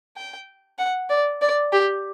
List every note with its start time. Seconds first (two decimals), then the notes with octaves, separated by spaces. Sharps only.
0.17 G5
0.78 F#5
1.10 D5
1.41 D5
1.73 G4